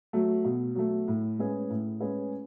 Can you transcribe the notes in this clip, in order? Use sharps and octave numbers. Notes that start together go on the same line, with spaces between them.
F#3 A3
B2
F#3 A3
A2
G#3 C#4 G#4 B4
A2
G#3 C#4 G#4 B4